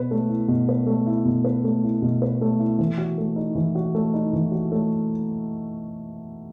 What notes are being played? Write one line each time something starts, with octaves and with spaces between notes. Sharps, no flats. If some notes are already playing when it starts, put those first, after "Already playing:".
Already playing: B2 B4
A3
E4
B2
B4
A3
E4
B2
B4
A3
E4
B2
B4
A3
E4
E3
F#4
A3
D#4
E3
F#4
A3
D#4
E3
F#4
A3